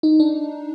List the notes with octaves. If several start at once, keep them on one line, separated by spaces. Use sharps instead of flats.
D#4
D4